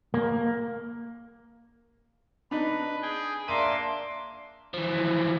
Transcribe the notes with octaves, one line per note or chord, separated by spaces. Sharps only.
A#3
D4 D#4 B4
G#4 G5
A#3 D4 E5 C6 D6 D#7
E3 F3